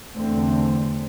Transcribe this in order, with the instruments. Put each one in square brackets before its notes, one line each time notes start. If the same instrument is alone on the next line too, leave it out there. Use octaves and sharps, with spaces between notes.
[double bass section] E2 D3 A3 C4